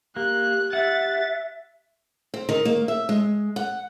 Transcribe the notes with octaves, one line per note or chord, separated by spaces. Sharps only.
A#3 G4 F#6
E5 F#5 A6
C4
D#3
A#3
E5
G#3
F#5